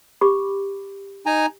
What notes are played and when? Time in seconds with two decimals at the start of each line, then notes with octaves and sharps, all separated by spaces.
0.21 G4 B5 D6
1.26 D#4 G#5 A#5